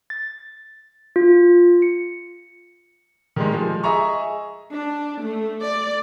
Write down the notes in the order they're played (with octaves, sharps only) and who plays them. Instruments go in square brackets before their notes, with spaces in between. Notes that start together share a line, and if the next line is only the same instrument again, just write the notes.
[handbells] A6
F4
C#7
[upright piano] D#3 G3 G#3
F3 G#3
G#4 D#5 E5 G#5 A#5 C#6
[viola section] D4
A3
D5